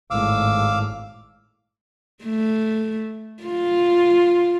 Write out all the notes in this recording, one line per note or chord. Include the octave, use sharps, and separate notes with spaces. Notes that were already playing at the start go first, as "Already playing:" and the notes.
G#1 A2 F5 D6 E6
A3
F4